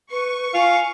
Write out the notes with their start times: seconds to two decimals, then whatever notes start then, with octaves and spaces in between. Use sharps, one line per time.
0.11 B4 C#6
0.54 F4 F5 G#5